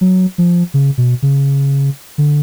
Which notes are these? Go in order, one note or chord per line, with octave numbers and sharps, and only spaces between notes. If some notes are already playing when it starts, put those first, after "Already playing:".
F#3
F3
C#3
B2
C#3
D3